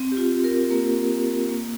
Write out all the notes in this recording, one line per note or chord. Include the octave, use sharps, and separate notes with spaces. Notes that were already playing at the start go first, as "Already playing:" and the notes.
Already playing: C4
G4
F4
A#4
A#3
A#3